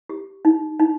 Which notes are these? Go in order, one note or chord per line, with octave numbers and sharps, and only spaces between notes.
G4
D#4
D#4